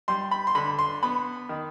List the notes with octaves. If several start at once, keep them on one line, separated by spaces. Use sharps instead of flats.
G3 C6
B5
C6
D3 B5
C6
B3 B5
D#3